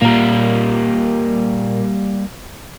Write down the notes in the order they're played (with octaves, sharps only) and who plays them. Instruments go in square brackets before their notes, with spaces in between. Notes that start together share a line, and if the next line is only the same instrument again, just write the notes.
[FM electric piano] A#2 A#4 [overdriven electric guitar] G3 A#3